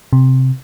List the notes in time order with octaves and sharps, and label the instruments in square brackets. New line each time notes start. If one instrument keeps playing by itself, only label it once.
[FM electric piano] C3